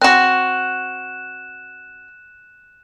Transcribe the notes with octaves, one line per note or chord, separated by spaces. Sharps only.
C4 F#4 F#6 E7